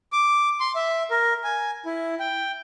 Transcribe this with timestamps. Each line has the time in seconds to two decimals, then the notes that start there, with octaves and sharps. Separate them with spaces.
0.12 D6
0.60 C6
0.75 E5
1.11 A#4
1.44 G#5
1.86 E4
2.20 G5